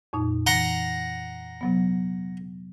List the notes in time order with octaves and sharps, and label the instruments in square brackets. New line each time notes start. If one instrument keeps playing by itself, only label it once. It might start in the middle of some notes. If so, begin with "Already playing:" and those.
[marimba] F2 A#2 D#4
[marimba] E3 [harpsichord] F#5 A#5 C6
[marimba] C3 F#3 B3